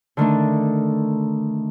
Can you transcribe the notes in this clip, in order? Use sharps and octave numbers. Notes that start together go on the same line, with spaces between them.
D3 D#3 A3 D4